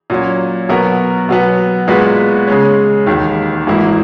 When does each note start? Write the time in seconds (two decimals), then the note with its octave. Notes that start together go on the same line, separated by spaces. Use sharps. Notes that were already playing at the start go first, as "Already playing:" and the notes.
0.10 A#2 F#3 C#4
0.69 B2 F#3 B3 F#4 A#4
1.29 B2 F#3 B3
1.88 A#2 G#3 B3 F#4 B4
2.47 C#3 G#3 C#4
3.06 E1 D#2 D#3
3.67 G#1 G#2 E3 A#3 E4